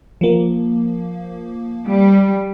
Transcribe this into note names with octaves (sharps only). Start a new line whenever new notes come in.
F3 A#3
G3